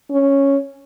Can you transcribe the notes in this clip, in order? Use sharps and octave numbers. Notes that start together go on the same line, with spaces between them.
C#4